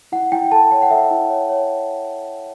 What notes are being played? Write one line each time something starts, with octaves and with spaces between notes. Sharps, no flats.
E4 F#5
E4 G5
A4 A5
C#5 G5
F#5
A4 E5
E4
C#5
C#5